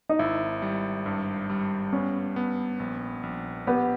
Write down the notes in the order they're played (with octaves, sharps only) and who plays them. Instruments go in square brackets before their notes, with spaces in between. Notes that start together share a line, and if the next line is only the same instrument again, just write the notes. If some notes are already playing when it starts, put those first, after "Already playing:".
[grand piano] D#4
[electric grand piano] G#1 [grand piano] E4
[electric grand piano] G3
G2
G3
[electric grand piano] B3 [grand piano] C#4
[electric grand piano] B3
A#1
A#1
[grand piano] B3 [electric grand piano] G4